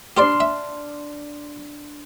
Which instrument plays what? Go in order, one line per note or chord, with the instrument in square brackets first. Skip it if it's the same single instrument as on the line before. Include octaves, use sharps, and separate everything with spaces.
[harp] D4 C6 F6 [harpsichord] G4 C5 D5
[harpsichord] E5